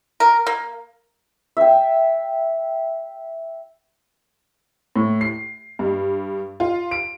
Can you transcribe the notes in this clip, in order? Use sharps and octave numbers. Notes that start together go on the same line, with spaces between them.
A#4
A#3
E5 G5
A2
C7
G2
F4
D7